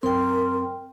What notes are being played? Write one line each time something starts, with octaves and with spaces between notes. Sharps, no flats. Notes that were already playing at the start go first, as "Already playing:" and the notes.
F#2 C4 A#4 G5 C6